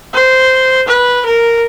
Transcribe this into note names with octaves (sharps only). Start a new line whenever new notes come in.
C5
B4
A#4